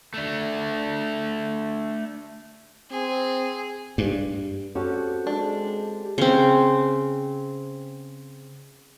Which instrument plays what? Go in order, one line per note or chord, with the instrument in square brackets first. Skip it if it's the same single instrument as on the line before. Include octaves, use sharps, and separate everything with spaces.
[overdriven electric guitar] A3 D4
[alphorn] C4 [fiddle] G#4
[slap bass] G2
[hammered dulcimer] C3 G4 [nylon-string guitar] C#4 F#4 A4
[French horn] G#3 [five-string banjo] D4
[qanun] C#3 C4